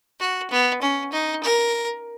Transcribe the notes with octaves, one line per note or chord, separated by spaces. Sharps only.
F#4
B3
C#4
D#4
A#4